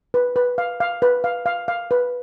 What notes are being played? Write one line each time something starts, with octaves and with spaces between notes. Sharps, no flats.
B4
B4
F5
F5
B4
F5
F5
F5
B4